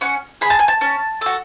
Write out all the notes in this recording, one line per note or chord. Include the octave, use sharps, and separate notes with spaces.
C#4 F#5
G#4 B5
A5
G#5
A5
C#4
F#4 A4